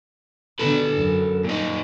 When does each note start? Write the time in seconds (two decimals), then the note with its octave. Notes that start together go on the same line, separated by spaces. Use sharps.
0.59 B2 D3 A4 B4
0.98 F#2
1.44 A#2 D#4